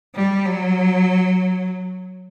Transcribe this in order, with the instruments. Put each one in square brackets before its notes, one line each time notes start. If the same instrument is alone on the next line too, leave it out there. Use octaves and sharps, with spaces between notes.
[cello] G3
F#3